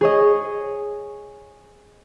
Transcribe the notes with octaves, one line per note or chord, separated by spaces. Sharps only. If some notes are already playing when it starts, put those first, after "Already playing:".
G#4 C#5 D#5